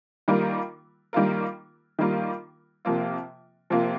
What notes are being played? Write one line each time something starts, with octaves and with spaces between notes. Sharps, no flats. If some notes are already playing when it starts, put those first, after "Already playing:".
D#3 G3 A#3 F4 A#4
D#3 G3 A#3 F4 A#4
D#3 G3 A#3 F4 A#4
C3 F3 A#3 F4
C3 F3 A#3 F4